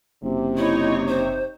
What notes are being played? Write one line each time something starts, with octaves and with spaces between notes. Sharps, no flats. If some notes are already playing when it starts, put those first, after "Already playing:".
F#1 C3
D#4 E4 C#5
C5